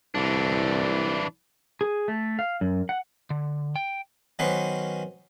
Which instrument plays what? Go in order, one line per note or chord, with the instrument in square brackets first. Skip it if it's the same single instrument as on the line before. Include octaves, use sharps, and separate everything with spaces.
[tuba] C2 [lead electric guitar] E3 D4
[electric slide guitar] G#4
A3
F5
F#2
F#5
D3
G5
[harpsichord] D#3 F#3 B3 C#4 B4 C5